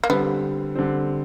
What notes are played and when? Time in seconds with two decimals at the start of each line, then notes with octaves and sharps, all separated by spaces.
0.04 A#3
0.09 D3 G3 B3 C4
0.75 D3 G3 C4